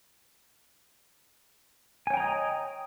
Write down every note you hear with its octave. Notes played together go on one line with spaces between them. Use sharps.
C#5 D#5 G5 G#5 A#5